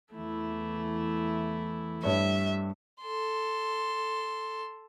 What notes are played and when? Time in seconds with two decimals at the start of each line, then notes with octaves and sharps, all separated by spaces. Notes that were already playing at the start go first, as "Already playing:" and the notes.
0.14 E2 E3 A3 E4
2.04 G2 G3 C#5 E5
3.02 A4 C6